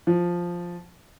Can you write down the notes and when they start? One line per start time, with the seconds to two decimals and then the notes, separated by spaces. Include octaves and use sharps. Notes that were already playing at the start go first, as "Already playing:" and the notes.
0.07 F3